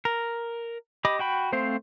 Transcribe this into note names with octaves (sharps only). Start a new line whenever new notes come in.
A#4
G4 D#5 B5 D6
F#4 G5 B5
A3 C4 C5 F5